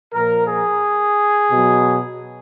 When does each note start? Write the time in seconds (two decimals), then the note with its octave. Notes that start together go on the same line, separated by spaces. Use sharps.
0.13 A#2 F3 A#4
0.47 G#4
1.51 B2 F#3